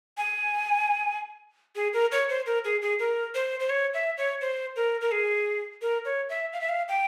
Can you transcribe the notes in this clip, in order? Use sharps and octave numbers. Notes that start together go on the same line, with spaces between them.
G#5
G#4
A#4
C#5
C5
A#4
G#4
G#4
A#4
C5
C5
C#5
E5
C#5
C5
A#4
A#4
G#4
A#4
C#5
E5
F5
E5
F5
G5